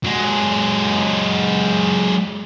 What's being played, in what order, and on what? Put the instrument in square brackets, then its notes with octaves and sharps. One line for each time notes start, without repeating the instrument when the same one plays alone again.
[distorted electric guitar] F#3 G#3